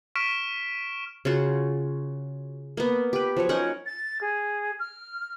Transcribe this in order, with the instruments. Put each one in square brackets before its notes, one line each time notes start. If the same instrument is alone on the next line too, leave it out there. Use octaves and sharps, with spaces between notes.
[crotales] C#6 F6 B6 D7 E7
[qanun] C#3 F4 F#4
A#3 B3
G4 B4
F3 F#3 C#5
C#4 D#4 A#4 F#5
[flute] A6
G#4
F6